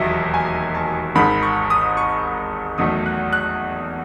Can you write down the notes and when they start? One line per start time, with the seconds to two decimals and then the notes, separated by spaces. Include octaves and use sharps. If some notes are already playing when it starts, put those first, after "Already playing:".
Already playing: E1 D#2 D#3 F#3 D#5 E5
0.34 G#5
0.74 A5
1.15 G#1 G#2 D#3 B5
1.43 C#6
1.70 D#6
1.97 C#6
2.78 E2 D#3 F#3 A3 D#6
3.06 F#6
3.33 F#6